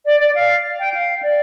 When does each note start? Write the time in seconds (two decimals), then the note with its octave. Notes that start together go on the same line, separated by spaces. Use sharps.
0.06 D5
0.20 D5
0.35 F5
0.79 G5
0.94 F5
1.23 D5